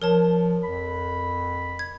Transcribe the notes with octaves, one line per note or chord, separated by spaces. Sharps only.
F3 A#4 C#5 A5
F2 B5
G#6